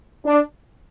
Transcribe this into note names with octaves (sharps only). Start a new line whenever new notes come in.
D4